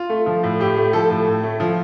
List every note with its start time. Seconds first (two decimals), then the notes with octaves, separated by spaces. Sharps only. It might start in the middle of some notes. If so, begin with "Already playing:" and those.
Already playing: F4
0.10 A3
0.26 F3
0.43 A2
0.60 A2 G4
0.77 A3
0.93 F3 A4
1.10 A2
1.27 A2
1.43 A3
1.60 F3